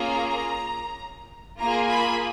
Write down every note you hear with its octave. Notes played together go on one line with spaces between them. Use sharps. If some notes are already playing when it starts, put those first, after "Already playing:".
Already playing: A#3 C#4 F4 G#4 A#5
A#3 F4 G#4 A#5
B5